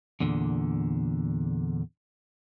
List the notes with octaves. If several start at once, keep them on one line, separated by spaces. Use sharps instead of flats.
E2 A#2 D3